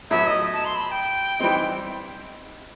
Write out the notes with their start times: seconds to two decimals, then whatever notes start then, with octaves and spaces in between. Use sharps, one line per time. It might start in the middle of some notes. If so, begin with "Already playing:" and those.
0.10 A2 F#3 B3 E5
0.27 D#5
0.53 A5
0.65 C6
0.75 B5
0.91 G5
1.39 E3 G3 C4 D#4